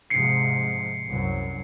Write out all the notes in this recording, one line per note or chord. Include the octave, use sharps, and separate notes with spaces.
G#2 C3 F3 C7 C#7
C2 F#2 F#3